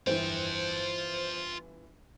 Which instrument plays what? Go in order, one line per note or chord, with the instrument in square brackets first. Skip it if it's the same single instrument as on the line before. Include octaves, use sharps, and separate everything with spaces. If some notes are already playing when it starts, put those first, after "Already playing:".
[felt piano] G1 E3 [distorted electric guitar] F4 G5 [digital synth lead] C5